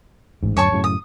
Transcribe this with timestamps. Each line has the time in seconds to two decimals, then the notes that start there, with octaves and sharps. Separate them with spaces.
0.43 A1 G#2
0.57 D1 F#2 C#5 A5 C#6
0.72 F#2 A2 C#3
0.84 D#6